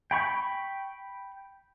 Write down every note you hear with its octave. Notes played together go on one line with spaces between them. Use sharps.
G5 B5 C#6